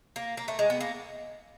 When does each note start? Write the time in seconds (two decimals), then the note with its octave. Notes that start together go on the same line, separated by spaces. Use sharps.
0.16 A#3
0.37 A#3
0.48 A3
0.59 G#3
0.70 B3
0.81 A#3